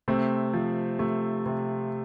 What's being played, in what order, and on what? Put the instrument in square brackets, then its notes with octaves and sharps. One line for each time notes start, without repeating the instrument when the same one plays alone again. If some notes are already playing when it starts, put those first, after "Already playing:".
[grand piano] C3 A3 C4
F3
C3 A3
C3